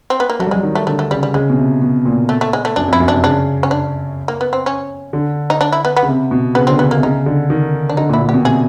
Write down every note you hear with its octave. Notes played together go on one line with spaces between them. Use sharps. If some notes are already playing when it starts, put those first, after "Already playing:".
C4
B3
A#3
F#3 A3
G3
F#3 G#3
D#3
A3
D3 A3
A3
C#3 G3
G3
C#3 G#3
B2
C3
B2
A#2
A3
A3
G#3
A3
F#2 D4
F2
E4
F#2
C3 D4
C#3 D4
C#4
D4
A#3
B3
C4
C#4
D3
D#4
D4
E4
B3
B3
C#3
C3
B2
C#3 B3
D3 C4
C#3 B3
A#3
C3
C#3 D#4
D3
D#3
D4
D3 D#4
A#2
E4
A#2
B2 G4
C3 G#4